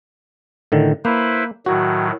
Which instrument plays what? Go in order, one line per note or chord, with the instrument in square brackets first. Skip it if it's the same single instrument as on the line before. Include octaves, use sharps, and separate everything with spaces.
[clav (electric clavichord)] A2 D3 D#3
[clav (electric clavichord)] A#3 [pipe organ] E4 B4 C5
[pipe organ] A2 D#3 F#3 [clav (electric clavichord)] F#4